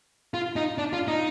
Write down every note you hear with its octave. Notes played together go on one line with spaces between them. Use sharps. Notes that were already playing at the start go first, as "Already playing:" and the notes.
F4
D#4
D4
F4
D#4